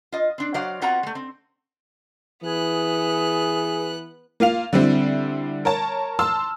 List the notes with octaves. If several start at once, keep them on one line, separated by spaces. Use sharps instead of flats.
F4 D#5
C4 D4
F#3 F#4 C5 D5 F5
B3 C4 F4 F#4 F#5 A#5
G#3 A3
C4
E3 B3 G#4 F#6
A#3 F4 F5 F7
D3 G3 C4 E4
A#4 C#5 A5
A5 C6 E6 F6